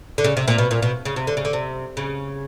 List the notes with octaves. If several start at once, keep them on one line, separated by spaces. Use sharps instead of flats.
D3
C#3
C3
A#2
B2
A#2
B2
C#3
C3
D3
C#3
D3
C3
C#3